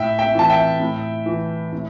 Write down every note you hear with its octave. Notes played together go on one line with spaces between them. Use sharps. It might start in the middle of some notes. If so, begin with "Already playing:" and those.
Already playing: A2 E5 G5
E5 G5
E3 A5
E5 G5
A2
E3
A2